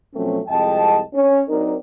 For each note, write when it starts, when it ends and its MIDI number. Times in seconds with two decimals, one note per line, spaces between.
0.15 0.38 47
0.15 0.38 53
0.15 0.38 54
0.15 0.38 57
0.15 0.38 60
0.15 0.38 61
0.47 0.98 36
0.47 0.98 41
0.47 0.98 56
0.47 0.98 75
0.47 0.98 79
0.47 0.98 81
1.13 1.40 61
1.48 1.74 54
1.48 1.74 60
1.48 1.74 62
1.48 1.74 63
1.48 1.74 70